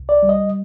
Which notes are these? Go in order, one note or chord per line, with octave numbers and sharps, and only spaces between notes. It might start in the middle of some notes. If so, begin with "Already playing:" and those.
Already playing: C2
D5
G3
D#5